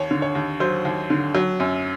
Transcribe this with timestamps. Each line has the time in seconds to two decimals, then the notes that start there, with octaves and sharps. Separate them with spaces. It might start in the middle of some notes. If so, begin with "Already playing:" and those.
Already playing: D#2 C#5
0.11 D3
0.22 C#5
0.35 D#2
0.60 F#3 C5
0.85 D#2
1.10 D3
1.35 F#3
1.60 F#2